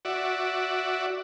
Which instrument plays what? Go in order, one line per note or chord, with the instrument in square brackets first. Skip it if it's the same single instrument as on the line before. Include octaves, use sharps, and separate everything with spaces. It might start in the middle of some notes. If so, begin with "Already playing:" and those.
[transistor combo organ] F#4 D5 E5